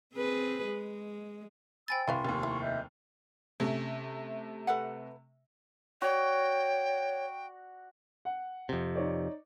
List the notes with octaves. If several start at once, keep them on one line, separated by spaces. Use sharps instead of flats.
C4 G#4 B4
G#3
C5 G5 G#5 B5 E6 A6
C2 E4 B4 F5 C6 C#6
F1 D#2
E4
D#5 E5 G6
C3 A3 C#4
A4 B4 F#5
F#4 C#5 D5 G5
F#5
F2 C3
D#4 C#5 D5